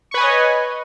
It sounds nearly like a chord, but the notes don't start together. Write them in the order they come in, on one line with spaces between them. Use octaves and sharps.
C#6 B4 G#5 D#5 C#5